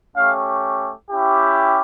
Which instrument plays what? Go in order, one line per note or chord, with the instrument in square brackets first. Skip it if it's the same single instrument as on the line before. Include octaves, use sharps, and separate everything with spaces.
[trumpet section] A3 C#4 G4 F5
C#4 E4 G4